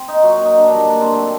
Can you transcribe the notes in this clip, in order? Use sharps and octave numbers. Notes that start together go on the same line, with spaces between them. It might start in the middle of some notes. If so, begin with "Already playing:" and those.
Already playing: C4
D#4
A#2 F#3 F#4
D#4
D#4
D4
G2 D#3 F#3 D4
A#3
D4
C4
D#3 F#3 A3